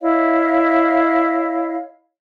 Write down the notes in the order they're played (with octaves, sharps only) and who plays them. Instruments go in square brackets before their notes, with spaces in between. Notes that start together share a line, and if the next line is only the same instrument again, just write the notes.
[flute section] E4 C#5 D#5 F5